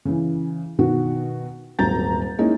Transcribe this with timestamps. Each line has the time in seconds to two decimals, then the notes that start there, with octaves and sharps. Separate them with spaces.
0.05 C#3 E3
0.79 B2 D#3 F#4
1.79 D#1 G#1 F#3 A#5 G6 A6
2.38 G#3 A#3 C#4 D#4 E4 A#4